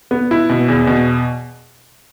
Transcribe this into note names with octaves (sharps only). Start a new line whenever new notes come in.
B3
E4
B2
E2
B2